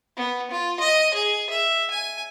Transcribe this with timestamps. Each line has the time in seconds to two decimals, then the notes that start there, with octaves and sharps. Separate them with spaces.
0.16 B3
0.51 F4
0.80 D#5
1.14 G#4
1.50 E5
1.90 G#5